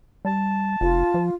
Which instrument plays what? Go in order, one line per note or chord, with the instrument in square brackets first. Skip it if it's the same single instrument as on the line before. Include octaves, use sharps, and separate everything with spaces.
[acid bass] G3 [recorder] A5
[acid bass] F1 [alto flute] F4
[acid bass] F3